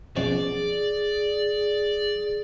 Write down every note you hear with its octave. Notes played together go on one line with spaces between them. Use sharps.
F#2 B2 F3 G#4 D5